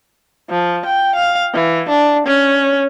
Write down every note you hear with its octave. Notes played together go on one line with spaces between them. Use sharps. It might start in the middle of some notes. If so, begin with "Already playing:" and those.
F3
G5
F5
E3
D4
C#4